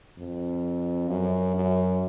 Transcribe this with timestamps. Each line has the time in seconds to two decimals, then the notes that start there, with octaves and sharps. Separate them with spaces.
0.18 F2
1.09 F#2
1.55 F#2